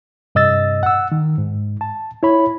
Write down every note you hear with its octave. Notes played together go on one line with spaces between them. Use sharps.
G2 C3 D#5 E6 A6
F#5 E6
D#3
G#2
A5
E4 C#5 B5